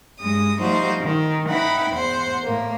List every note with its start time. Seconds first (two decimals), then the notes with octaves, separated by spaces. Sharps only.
0.20 G2 G#3 D#6
0.59 F3 G3 A3 D#4 F#4 C5
1.02 D#3
1.48 D#4 E4 B4 F#5 G5 B5
1.91 E2 C5 F#5
2.43 A2 A#3